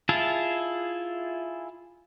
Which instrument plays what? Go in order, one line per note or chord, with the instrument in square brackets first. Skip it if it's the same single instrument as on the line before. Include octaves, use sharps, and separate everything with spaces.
[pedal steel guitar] E4 F4 G#4 E5 A5